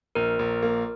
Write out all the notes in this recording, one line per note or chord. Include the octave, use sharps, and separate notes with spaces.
A#1 A#4
A#1
A#3